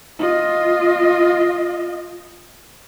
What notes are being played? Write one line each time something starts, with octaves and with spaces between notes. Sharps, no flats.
F4 D#5